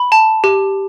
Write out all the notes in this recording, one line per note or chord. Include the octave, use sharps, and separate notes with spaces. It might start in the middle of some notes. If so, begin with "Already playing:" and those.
Already playing: B5
A5
G4